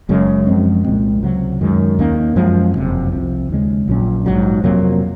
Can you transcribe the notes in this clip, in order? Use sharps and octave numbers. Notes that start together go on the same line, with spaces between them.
F#1 F#2 C#3 G#3
F#2 F3 G#3 C4
C2 A#2 G#3 C4
C#2 C3 F#3
F#2 D#3 G#3
D#2 D#3 A#3 C#4
F#2 F3 G#3
F#1 F2 C3 F#3
C2 C3 F3
D#2 C#3 G#3
A#1 A#2 F#3 C#4
A#1 G#2 D#3 F#3
F2 C3 F#3 A#3